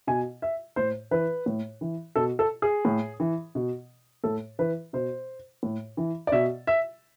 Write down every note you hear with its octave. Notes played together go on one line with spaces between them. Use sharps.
B2 G#5
E5
A2 C5
E3 B4
A2
E3
B2 A4
A4
G#4
A2
E3
B2
A2 A4
E3 B4
B2 C5
A2
E3
D5
B2 E5
E5